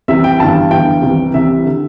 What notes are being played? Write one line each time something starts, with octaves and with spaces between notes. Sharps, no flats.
C2 C3 E3 E5
G5
G1 G2 E3 A5
G1 G2 E3 G5
C2 C3 E3
C2 C3 E3 E5
D3